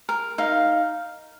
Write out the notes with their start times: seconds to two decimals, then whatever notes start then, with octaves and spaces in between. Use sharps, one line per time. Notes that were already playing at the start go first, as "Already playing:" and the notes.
0.09 A#4
0.38 D#4 F5